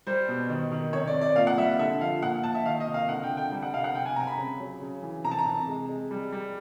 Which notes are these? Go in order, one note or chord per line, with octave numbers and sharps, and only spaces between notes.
G3 C5
B2
D#3
D#3
C3 C#5
D5
C3
D5
A#2 F5
F#5
G3 E5
D3 E5
F3 F5
A#2 F#5
A#2 A5
E5
D#3 F5
D#5
C3
F5
D3 F#5
G5
D3
G5
G3
F#5
C3 F5
F#5
C3 G5
G#5
C3 A#5
B5
C#3
F#3
C#3
E3
C3 A#5
A5
A#5
C3
G#3
G#3
G3
G3